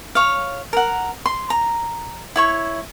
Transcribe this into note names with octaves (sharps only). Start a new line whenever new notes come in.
C#5 F5
A#4 F#5
C6
A#5
E4 C#5 C#6